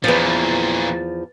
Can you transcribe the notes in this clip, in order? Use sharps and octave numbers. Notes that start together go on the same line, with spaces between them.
E2 A#2 E3 F3 B4 A6